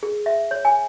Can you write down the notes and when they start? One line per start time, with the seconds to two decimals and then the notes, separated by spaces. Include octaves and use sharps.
0.03 G#4
0.26 E5
0.51 C#5
0.65 G#5